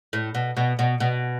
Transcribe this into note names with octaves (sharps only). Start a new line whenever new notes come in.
A2
B2
B2
B2
B2